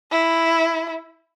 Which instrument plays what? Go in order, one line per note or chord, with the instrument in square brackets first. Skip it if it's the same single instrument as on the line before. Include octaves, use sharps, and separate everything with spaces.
[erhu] E4